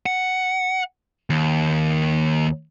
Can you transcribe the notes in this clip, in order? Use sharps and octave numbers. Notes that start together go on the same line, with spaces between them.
F#5
D#2